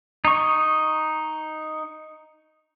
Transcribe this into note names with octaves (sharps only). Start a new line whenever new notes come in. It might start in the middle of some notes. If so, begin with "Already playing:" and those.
D#4 C#6